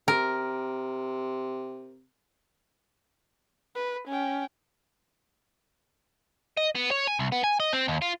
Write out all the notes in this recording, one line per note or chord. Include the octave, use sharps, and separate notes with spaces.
C3 A#4
B4
C#4 G5
D#5
B3
C#5
G#5
C2
B3
G#5
D#5
C4
D#2
F4